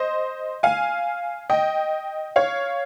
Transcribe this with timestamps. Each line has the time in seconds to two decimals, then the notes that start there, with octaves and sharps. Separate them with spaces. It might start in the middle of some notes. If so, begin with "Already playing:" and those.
Already playing: C5 D#5
0.63 F5 G#5
1.50 D#5 G5
2.36 C#5 F5